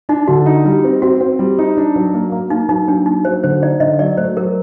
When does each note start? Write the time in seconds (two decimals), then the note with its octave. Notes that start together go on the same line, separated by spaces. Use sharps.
0.09 D4 D#4
0.28 D3 F#4
0.46 D#4
0.65 G3
0.84 C4
1.02 C4 F#4
1.21 C4
1.39 G3
1.59 D#4
1.77 D4
1.96 F#3
2.14 A#3
2.32 A#3
2.50 A#3 D#4
2.69 F#3 D#4
2.88 F#3 D4
3.06 A#3 D#4
3.25 F#3 C5
3.44 D3 C5
3.62 D#4 D5
3.80 D3 D#5
3.99 F#3 D5
4.17 A3 C5
4.37 F#3 A#4